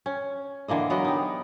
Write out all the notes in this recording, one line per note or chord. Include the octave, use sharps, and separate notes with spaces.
C#4
D3 E3 A#3 D#5
F#3 B3 A#4 D#5
D#4 G4